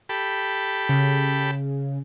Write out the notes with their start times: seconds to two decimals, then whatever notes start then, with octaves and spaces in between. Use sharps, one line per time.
0.09 G4 A4 B5
0.89 C#3